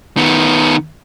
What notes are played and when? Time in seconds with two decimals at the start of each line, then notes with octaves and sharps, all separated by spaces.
0.17 D#3 B3